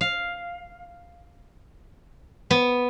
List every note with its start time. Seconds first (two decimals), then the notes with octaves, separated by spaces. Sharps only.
0.01 F5
2.51 B3